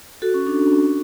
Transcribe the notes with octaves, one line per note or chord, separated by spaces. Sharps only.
F#4 A4
C#4
D4
D4